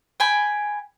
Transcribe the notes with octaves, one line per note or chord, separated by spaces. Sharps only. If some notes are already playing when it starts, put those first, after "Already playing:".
G5 G#5 B5